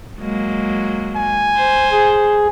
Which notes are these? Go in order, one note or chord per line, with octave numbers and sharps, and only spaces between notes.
F#3 G#3 A#3
G#5
C5
G#4